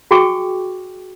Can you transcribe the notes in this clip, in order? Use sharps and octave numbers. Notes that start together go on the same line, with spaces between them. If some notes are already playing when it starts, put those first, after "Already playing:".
F#4 G#4 G5 G#5 C#6 D6